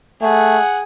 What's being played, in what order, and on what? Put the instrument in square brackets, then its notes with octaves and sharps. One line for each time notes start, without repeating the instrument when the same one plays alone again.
[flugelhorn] A3 [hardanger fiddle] G#4 [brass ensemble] F#5